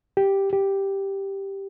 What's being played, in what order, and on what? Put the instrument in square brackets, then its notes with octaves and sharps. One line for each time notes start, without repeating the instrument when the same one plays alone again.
[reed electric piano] G4
G4